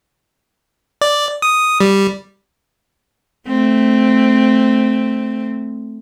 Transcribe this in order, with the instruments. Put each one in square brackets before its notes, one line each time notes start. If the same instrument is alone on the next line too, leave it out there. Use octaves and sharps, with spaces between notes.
[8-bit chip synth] D5
D#6
G3
[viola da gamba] A3 C4